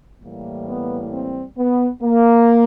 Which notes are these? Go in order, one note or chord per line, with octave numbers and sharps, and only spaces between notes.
A2 E3 G3 A#3
B3
C4
B3
A#3